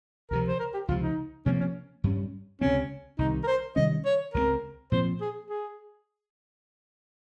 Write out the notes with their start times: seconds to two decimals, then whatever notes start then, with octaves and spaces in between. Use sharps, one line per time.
0.30 C#2 C3 F3 A#4
0.48 C5
0.60 A#4
0.74 G4
0.88 C#2 C3 F3 F4
1.02 D#4
1.46 C3 F3 A#3 C#4
1.60 C#4
2.04 G2 G3 C#4
2.61 C#2 C3 G3 C4 C#4
3.18 C2 C3 D#3 D#4
3.44 A#4
3.47 C5
3.76 C3 D#3 G3 C#4 D#5
4.06 C#5
4.34 C#2 C#3 G3 C4 A#4
4.92 A#2 F3 C4 C5
5.21 G#4
5.50 G#4